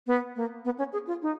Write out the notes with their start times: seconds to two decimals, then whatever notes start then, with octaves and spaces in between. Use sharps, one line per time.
0.07 B3
0.36 A#3
0.65 B3
0.78 C#4
0.93 G#4
1.07 F4
1.22 D#4